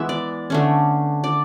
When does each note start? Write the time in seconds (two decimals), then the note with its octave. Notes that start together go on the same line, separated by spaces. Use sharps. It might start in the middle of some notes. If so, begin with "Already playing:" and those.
Already playing: E3 G#3 B3 E5
0.09 D5
0.50 D3 A3 C#4
1.24 D5